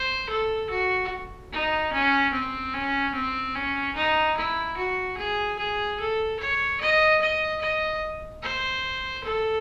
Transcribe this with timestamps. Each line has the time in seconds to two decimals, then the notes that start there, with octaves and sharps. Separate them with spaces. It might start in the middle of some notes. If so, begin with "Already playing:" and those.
Already playing: C5
0.29 A4
0.70 F#4
1.52 D#4
1.93 C#4
2.33 C4
2.73 C#4
3.15 C4
3.55 C#4
3.96 D#4
4.37 E4
4.77 F#4
5.17 G#4
5.59 G#4
6.00 A4
6.40 C#5
6.81 D#5
7.22 D#5
7.61 D#5
8.43 C5
9.24 A4